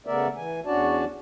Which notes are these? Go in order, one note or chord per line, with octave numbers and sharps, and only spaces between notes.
C#3 A3 B3 A#4 D5 E5
E3 G#5
E2 C#4 D4 F#4 D5 A5